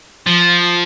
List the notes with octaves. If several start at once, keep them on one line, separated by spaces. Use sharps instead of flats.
F3